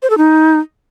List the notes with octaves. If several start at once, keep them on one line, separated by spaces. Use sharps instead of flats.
C5
A4
D#4